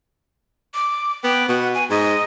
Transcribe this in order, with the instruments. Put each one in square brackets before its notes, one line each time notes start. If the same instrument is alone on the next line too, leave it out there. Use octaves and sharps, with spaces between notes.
[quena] D6
[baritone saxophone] B3 [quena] G5
[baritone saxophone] B2 [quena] F#5
[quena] G#5
[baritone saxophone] G#2 [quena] D#5